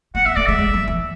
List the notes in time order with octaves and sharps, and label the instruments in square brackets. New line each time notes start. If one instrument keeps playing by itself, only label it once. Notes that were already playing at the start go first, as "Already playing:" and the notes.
[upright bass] A3 [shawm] F#5
[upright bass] B3 [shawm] E5
[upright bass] A3 [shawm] D5
[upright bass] G#3 [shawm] E5
[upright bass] G#3
F#3
E3